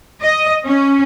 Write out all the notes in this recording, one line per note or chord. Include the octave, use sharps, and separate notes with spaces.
D#5
C#4